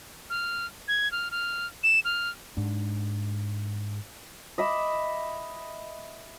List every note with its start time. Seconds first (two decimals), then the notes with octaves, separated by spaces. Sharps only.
0.30 F6
0.88 G#6
1.12 F6
1.31 F6
1.83 E7
2.05 F6
2.57 G#2 D4
4.58 D#5 E5 B5 D6